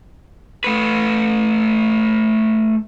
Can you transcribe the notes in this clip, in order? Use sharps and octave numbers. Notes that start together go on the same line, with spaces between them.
A3 B4